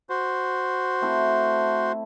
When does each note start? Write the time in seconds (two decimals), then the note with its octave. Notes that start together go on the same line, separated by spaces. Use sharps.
0.10 F#4 C5
1.01 A3 C4 E4